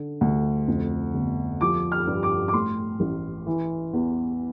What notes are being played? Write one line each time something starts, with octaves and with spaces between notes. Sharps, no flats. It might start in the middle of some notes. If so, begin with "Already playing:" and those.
Already playing: D3
D2
F2
G1
F3 D6
F6
G2
D6
D6
A2 C6
A1
E3
E2